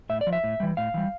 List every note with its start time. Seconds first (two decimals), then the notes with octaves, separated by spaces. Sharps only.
0.09 A2 E5
0.21 D5
0.27 F3
0.33 E5
0.44 A2
0.60 E3 G3
0.77 A2 F5
0.94 E3 G3